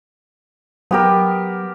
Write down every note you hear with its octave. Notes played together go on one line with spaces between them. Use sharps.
F#3 B3 G4 A#4